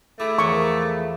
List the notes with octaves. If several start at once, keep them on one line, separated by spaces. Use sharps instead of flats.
A3 E4 G#4 D6 E6
E2 F3 A#4 C#6